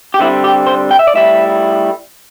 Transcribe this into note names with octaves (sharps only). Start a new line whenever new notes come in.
G4
D3 G3 C4 E4
G4
C5
G5
E5
D5
A2 G3 E4 E5